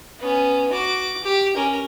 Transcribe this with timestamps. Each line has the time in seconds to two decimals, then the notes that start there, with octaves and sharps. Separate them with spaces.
0.20 B3 C#4
0.73 F#4 D6
1.24 G4
1.56 C#4 A#4